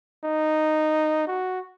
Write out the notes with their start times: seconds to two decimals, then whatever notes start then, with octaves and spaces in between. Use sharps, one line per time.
0.24 D#4
1.27 F#4